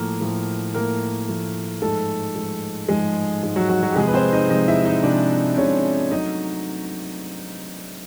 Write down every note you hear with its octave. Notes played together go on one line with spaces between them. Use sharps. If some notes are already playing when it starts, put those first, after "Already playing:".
Already playing: A2 F3 A3 A#3 A#4
A2 F3 A3
A2 F3 A3 A#3 A#4
A2 F3 A3
G#2 F3 G#3 A3 A4
G#2 F3 G#3
G#2 F3 G#3 G#4
G#2 F3 G#3
F#3 F#4
F#3 F#4
F#3 F#4
G4
C3 F3 G#3 G#4
B4
C4 C5
D#4 D#5
C3 F3 G#3 D#4 D#5
E4 E5
D#4 D#5
C3 F3 G#3 D4 D5
C3 F3 G#3 C#4 C#5
F#3 A3 D#4 D#5